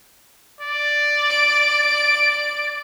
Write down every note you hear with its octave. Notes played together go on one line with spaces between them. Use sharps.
D5
D7